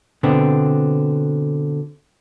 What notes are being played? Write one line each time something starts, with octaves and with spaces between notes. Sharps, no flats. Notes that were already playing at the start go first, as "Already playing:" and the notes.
B2 D3 B3 C4